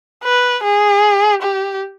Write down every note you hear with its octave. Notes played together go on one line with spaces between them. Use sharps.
B4
G#4
G4